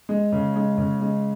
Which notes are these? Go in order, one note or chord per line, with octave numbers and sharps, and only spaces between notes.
G#3
C#3
G#3
C#3
G#3